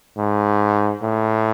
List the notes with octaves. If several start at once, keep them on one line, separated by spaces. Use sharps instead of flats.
G#2
A2